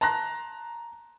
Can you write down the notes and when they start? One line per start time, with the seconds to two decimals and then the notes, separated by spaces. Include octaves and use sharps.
0.01 A5 A#5 C6 F#6 A#6